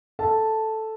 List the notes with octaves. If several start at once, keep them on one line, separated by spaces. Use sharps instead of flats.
A4 A5